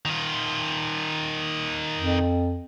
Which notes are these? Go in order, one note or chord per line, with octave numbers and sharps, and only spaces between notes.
D#3 F4
F2